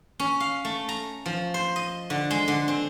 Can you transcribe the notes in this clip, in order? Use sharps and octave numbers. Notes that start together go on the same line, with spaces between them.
C#4
F5
A3
A#5
F3
C5
D#5
D3
G#3
D3
C4